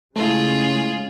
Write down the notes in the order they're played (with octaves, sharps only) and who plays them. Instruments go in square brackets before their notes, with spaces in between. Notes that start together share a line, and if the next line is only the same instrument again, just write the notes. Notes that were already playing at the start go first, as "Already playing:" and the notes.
[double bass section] C#3 G#3 C#4 [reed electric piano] A3 E4 [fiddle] F4 G#4